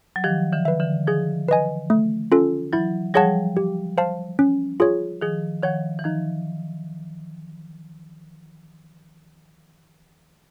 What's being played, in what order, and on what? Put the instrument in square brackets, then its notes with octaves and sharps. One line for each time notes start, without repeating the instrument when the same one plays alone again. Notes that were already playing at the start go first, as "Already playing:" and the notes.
[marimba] F#3
[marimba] D#3 F3 [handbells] G4
[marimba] D3 E3
[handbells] B4 E5
[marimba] D3 E3
[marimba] D#3 F3 [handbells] G#4
[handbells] B4 D#5 G#5
A3
C#4 F4 A4
[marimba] E3 F#3 [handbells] E4
[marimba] F3 G3 [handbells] G#4 C#5 F#5 A5
[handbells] G4
C5 F5 A5
C#4
F4 G#4 C#5
[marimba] D#3 F3 [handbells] G#4
[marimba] D#3 F3 [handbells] C#5 F#5
[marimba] E3
[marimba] D#3 F3 [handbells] D#4